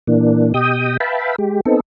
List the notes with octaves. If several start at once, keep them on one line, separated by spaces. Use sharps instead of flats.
A#2 E3 A#3 D4
B2 G4 D#5 G5 D#6
B4 E5 F5 G5 A5 B5
G#3 G4
B3 C4 D#4 A4